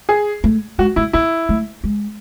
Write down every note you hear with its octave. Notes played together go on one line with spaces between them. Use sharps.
G#4
A3
G#3 F#4
A3 E4
B3 E4
A3
G#3